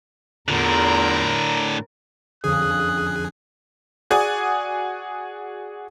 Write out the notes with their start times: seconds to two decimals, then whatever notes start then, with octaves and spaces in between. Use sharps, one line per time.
0.48 E2 A2 D3 F4 A#4 A#5
2.44 F2 D3 F3 C#4 G#4 D#6 F#6
4.10 F#4 G#4 D5 G#5 D#6